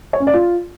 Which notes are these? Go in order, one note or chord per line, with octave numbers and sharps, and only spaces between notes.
C#5
C#4
D5
F4